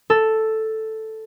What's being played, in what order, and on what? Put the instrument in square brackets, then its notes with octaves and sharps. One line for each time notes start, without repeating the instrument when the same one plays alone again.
[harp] A4